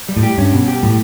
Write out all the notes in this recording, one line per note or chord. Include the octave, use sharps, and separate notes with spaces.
G3
A2
G4
G2 C#4
B2
G4
A2 G3